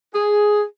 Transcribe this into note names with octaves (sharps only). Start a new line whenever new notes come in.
G#4